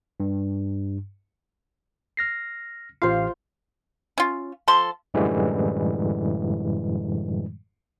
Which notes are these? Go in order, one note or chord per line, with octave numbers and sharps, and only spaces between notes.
G2
F6 A#6 C7
A1 F4 G4 C5 F5
C#4 F4
F3 A4 C6
F#2 A2 D3 E3 G3 G#3